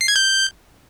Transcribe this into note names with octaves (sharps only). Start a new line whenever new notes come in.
C7
G#6
G6